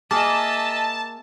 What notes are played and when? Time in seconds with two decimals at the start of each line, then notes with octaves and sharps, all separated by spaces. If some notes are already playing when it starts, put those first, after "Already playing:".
0.11 A#3 G#4 D#5 E5 A5